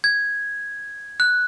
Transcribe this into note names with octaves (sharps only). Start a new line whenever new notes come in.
G#6
F#6